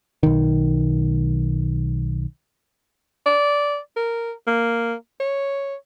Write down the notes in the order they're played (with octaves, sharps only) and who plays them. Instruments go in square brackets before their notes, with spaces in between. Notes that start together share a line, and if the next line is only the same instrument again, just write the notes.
[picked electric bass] B1 D#3
[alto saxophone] D5
A#4
A#3
C#5